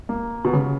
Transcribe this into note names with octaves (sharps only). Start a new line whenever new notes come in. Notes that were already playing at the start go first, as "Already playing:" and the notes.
A#3
B2
C#3